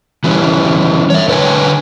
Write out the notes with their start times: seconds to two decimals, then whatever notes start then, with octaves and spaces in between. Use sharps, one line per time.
0.24 E3 G3 C#4
1.10 C#5 E5
1.28 D3 B4 C#5 D#5 G5 G#5